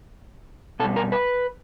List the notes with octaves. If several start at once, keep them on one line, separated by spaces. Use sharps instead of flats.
B2 G3 A4
A#4
B4